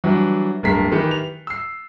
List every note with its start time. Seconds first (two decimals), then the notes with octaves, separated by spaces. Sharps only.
0.04 E3 F#3 G3 D4
0.63 D1 G2 A#3 A#4 B6 C7
0.92 D#3 E3 G4 B4 C#7
1.11 F7
1.47 E6 C7